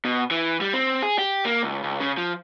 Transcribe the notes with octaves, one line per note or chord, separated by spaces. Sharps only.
B2
E3
G3
C4
G#4
G4
A#3
C#2
C#2
C#3
F3